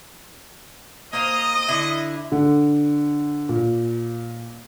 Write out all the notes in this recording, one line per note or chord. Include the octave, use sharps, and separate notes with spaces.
A#3 C5 D#5 F5 D#6
D3 E4
D3
A#2